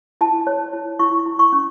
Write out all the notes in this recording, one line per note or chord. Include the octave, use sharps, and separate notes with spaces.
E4 A5
C#5
E4
E4 C#6
E4
C#6
C#4